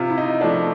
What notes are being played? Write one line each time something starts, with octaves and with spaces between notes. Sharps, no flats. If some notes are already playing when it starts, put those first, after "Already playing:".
Already playing: C3 F4
E4
D#4
F3 A3 D4